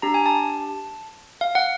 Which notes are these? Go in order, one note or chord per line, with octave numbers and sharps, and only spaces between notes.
D4 G4 A#5
G#5
A5
F5
F#5